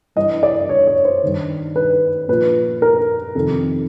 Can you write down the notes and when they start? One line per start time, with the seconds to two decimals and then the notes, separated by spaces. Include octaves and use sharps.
0.16 G2 E3 D#5
0.43 D5
0.69 C#5
0.87 C#5
1.05 C5
1.23 G2 D#3
1.76 B4
2.28 A#2 F3 B4
2.82 A#4
3.35 F2 C3 D#3 A4